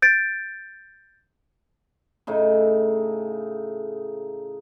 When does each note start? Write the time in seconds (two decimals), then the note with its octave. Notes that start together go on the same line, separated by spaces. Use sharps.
0.02 G6 A6 D7
2.27 A2 C#3 D#4